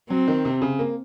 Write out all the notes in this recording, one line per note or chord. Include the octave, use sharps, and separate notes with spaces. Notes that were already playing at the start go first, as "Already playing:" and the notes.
F#3 C4
D#3
C3
C#3
A#3